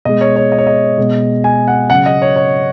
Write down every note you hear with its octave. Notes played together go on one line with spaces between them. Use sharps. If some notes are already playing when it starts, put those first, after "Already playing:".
B2 G#3 D#5
C#5
C#5
D#5
C#5
D#5
B2 G#3
G#5
F#5
C#3 F#3 F#5
D#5
C#5
C#5